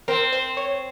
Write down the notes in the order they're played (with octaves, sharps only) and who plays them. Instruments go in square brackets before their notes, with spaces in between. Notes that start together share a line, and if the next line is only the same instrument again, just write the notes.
[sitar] C4 [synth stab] A#4
[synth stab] C5
C#5